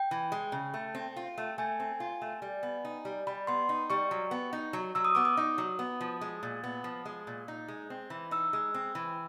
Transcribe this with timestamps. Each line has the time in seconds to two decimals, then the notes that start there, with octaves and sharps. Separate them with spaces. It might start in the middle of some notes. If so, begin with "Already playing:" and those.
Already playing: G5
0.11 E3
0.32 G#3
0.52 C#3
0.74 A3
0.95 C4
1.16 F4
1.38 A3
1.58 A3 G#5
1.80 C4
2.00 F4
2.22 A3
2.42 G3
2.63 B3
2.85 D#4
3.05 G3
3.27 G3 B5
3.47 B3 C6
3.69 D#4
3.90 G3 C#6
4.11 F#3
4.31 B3
4.53 D#4
4.73 F#3
4.95 F#3 E6
5.05 D#6
5.15 B3 D6
5.25 D#6
5.37 D#4
5.58 F#3
5.79 B3
6.01 F3
6.21 G#3
6.43 A#2
6.64 B3
6.84 F3
7.05 G#3
7.27 A#2
7.48 D#4
7.68 G#3
7.90 C4
8.10 E3
8.31 D#4 E6
8.53 G#3
8.74 C4
8.95 E3